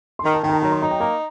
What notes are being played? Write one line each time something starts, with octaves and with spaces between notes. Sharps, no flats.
C6
D#3 A#5
A5
D#3 G5
A#5
A5
F#3 A#5
C6
D#4 A#5
G5
A#3 A#5